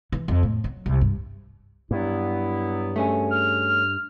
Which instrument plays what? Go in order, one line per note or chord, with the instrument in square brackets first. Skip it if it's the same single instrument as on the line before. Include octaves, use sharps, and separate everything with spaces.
[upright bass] E3
F2
A2
F#3
C2
G2
[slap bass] G2 [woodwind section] F#3 B3 E4
[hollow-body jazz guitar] A3 C#4 G#4
[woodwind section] F6